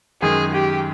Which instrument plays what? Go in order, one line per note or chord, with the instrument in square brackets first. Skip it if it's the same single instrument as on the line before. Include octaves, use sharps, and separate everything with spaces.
[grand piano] F#2 D#3 G#3 [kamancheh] G#4
[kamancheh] G4